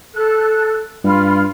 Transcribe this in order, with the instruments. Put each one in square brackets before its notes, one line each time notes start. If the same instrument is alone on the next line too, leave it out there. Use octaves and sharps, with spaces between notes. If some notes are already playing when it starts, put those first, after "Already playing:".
[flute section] A4 F#6
[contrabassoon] G2 [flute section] F4 B5 F6